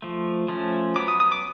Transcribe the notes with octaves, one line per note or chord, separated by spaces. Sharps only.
F3 A3
F3 A3 C#4
F#3 B3 D6
D#6
D#6
D6